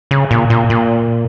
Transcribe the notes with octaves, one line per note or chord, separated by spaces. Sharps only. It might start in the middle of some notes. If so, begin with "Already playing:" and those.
C#3
A#2
A#2
A#2